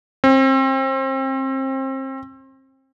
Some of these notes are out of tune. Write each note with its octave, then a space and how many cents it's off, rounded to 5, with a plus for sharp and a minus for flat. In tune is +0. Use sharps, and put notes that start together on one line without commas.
C4 +30